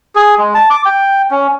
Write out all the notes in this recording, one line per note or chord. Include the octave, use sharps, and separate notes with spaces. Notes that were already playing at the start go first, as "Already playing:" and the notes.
G#4
G#3
A5
D6
G5
C#4